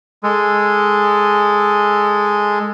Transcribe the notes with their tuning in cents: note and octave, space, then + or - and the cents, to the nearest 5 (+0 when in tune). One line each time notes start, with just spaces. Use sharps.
G#3 +0 A4 +0